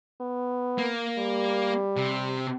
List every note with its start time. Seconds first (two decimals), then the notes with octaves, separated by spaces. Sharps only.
0.21 B3
0.78 A#3
1.18 G3
1.97 C3